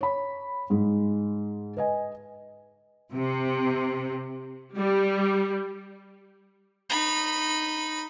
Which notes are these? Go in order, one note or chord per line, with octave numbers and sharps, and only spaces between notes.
C#5 B5
G#2 G#3 G#4
B4 D#5 G#5
C3
G3
D#4 B5